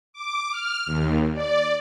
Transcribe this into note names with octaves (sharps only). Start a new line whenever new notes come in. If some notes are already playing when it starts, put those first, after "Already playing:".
D6
F6
D#2
D5